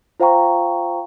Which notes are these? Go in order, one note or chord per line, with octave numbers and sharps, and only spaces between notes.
F4 C5 F5 G5 A#5 C#6